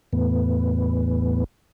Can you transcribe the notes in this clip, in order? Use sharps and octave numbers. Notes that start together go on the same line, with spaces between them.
E2 A2 B3